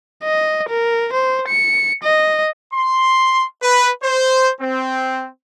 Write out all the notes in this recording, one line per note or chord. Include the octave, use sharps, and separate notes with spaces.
D#5
A#4
C5
C#7
D#5
C6
B4
C5
C4